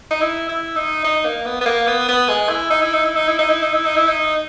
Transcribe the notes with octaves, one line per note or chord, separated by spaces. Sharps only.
D#4
E4
E4
D#4
D#4
A#3
B3
B3
A#3
B3
B3
G#3
E4
D#4
E4
D#4
E4
D#4
E4
D#4
E4
D#4
E4
D#4
E4
D#4